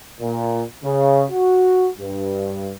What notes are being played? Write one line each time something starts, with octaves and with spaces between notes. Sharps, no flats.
A#2
C#3
F#4
G2